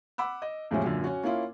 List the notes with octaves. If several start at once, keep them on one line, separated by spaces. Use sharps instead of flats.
F#5 B5 D6 E6
D#5
E2 A2 C3 F3 G#3 C#4
F#2 A#2 D3
C#4 F#4
A#3 C#4 E4 F4